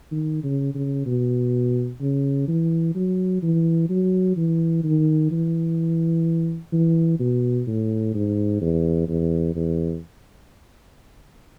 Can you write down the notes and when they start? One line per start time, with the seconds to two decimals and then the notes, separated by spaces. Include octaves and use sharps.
0.11 D#3
0.43 C#3
0.75 C#3
1.06 B2
2.01 C#3
2.48 E3
2.95 F#3
3.43 E3
3.89 F#3
4.37 E3
4.84 D#3
5.31 E3
6.72 E3
7.20 B2
7.67 A2
8.14 G#2
8.61 E2
9.09 E2
9.56 E2